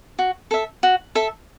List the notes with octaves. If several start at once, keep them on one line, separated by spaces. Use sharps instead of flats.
F#4
A4 E5
F#4
A4 E5